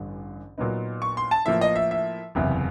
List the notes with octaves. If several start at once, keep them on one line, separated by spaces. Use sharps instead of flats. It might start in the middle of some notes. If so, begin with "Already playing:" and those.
Already playing: A1 G2 D3
A#2 F#3 B3 D#4
C#6
C6
A5
A2 F3 A#3 E5
D#5
E5
E5
F#1 E2 C3